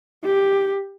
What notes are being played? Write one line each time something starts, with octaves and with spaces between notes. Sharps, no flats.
G4